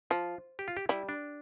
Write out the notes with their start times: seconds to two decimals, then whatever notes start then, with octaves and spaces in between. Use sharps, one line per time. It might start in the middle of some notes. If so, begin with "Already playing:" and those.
0.11 F3 F4
0.59 G4
0.68 F4
0.77 G4
0.89 G3 E4
1.09 D4